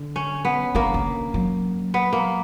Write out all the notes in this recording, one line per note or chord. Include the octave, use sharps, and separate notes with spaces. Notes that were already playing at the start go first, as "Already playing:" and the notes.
Already playing: D3
C#4
B3
D3 A#3
D3
F#3
B3
A#3